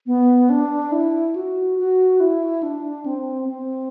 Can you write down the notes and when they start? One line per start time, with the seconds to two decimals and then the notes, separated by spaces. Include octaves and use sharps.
0.07 B3
0.50 D4
0.92 E4
1.36 F#4
1.78 F#4
2.20 E4
2.63 D4
3.06 C4
3.49 C4